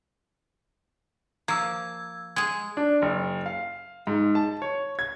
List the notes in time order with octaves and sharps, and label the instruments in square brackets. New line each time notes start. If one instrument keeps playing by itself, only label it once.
[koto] F3 [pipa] A#3 [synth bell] E6 G#6
[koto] G#3 G#4 [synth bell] G#6
[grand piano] D4
F#1
F5
G#2
A5
C#5
G#6